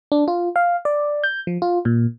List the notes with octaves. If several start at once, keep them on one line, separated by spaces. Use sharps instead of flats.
D4
F4
F5
D5
G6
F3
F4
A#2